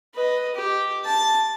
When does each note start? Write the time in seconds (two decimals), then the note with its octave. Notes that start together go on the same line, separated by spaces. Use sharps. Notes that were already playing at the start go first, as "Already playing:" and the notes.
0.15 B4 D#5
0.55 G4
1.05 A5